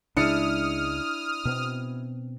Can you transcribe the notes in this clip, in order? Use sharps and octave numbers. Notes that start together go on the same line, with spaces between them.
C#2 C#3 G#3 D4 E4 D#6 F6 C#7
B2 B3 C4